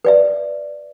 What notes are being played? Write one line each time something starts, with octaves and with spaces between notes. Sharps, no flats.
B4 D5 E5